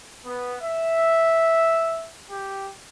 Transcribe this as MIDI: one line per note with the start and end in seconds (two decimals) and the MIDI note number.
0.25 0.55 59
0.60 2.07 76
2.30 2.69 67